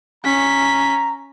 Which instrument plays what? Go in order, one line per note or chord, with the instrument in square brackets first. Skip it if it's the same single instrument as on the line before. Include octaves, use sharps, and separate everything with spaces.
[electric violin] C#4 B6 [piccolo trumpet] A#5